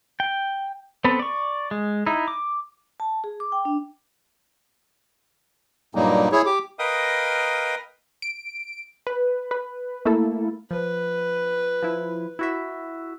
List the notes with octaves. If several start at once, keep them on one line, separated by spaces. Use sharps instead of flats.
G5
B3 C4 A4 B4
D5 C#6
G#3
D#4 E4
D6
A5
G#4
D6
G5
D4
G2 A#2 F#3 G3 A#3 D#4
E4 G#4 C#5
G4 D6
A#4 B4 D#5 F5 G5 D#6
D7
B4
B4
A3 A#3 E4 A4
F3 B4
F3 E4
E4 F#4 E5